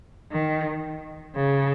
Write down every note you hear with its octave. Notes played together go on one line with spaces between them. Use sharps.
D#3
C#3